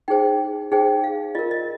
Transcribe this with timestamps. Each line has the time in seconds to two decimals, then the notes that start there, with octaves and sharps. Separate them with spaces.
0.08 D#4 G#4 C5 G5
0.72 D#4 G#4 C5 G5
1.04 F5
1.35 F4 A#4 D#5
1.51 D#5